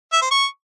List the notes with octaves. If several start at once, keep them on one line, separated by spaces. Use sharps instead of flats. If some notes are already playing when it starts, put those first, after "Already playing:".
E5
C5
C#6